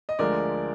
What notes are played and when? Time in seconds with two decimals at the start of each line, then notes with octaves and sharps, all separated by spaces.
0.09 D#5
0.19 D2 D3 F3 G#3 A#4 D5